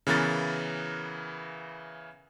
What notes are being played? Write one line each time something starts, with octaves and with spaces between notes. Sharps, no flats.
C#3 E3 B3 A#4 A6